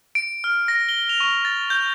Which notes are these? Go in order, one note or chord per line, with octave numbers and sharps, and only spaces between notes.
D7
F6
A#6
G7
F7
C#6
A6
G6